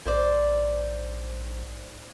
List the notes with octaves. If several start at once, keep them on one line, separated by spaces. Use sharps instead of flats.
A#1 G#2 C5 D5